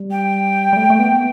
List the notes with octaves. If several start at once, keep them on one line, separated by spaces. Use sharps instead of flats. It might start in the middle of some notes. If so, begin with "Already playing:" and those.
Already playing: G3
G5
G3
A3
A3
B3